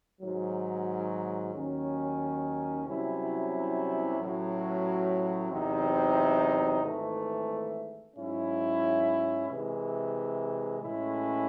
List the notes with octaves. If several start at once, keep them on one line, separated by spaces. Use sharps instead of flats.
G#1 G#2 F#3
D#2 D#3 F#3 C#4
C2 C3 F#3 C#4 E4
A1 A2 F#3
E2 C3 F#3 C4 D#4
G#1 G#2 E3 A3
G#2 F#3 C#4 E4
C3 E3 G#3
A1 A2 G#3 C#4 E4